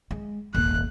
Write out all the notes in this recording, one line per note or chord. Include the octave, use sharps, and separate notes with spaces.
G#3
D#1 G#1 C3 A#3 F#6